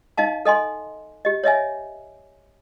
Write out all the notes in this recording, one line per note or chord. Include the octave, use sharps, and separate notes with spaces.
D#4 D#5 F5 A5
A4 D#5 G#5 C6
G4 D#5
C#5 D#5 E5 G#5